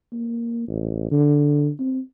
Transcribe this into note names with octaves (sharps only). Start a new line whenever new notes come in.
A#3
A1
D3
C4